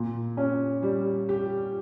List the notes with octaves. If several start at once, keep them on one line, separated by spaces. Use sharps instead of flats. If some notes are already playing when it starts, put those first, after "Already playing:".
Already playing: A#2
C#4
G3
G4